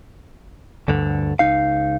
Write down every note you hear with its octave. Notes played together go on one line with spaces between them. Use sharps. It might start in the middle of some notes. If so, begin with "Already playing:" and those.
D2 G2 D3
C#2 D#4 F5